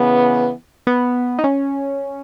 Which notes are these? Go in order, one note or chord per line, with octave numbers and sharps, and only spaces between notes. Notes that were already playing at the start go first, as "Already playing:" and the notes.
Already playing: C#3 E3 B3
B3
D#4
C#4